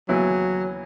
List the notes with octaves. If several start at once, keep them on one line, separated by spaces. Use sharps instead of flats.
D#2 C#3 E3 F#3 B3 E4